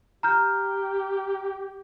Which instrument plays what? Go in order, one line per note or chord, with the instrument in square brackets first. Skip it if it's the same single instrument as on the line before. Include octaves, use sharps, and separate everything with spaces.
[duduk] G4 [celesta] A#5 F6 G6